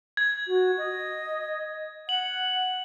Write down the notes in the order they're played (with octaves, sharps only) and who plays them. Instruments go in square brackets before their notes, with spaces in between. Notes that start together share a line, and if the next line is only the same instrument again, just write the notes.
[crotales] G#6
[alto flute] F#4
D#5
[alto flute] F#5 [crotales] F#7